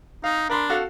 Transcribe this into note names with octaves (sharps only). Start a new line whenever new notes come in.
D#4 F5
D4 A#4 B5 C6
F#4 A4 F5